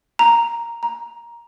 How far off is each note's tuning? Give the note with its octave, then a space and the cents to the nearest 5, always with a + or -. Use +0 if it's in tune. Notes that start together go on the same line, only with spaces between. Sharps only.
A#5 +0
A#5 +10